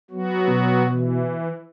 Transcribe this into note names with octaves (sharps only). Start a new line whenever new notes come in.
F#3 B3 F#4
B2
E3